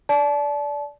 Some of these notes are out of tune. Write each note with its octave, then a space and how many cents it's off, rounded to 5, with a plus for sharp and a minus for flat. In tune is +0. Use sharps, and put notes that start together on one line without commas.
D5 -15 A5 -30